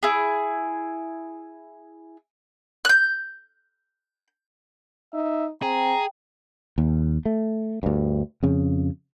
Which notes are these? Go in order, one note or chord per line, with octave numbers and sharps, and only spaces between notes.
E4 G#4
F#6 G6
D#4 E5
C4 G#4 G5 A#5
D#2
A3
D2 G2
F2 C#3